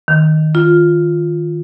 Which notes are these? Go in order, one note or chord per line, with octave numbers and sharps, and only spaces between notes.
D#3
F4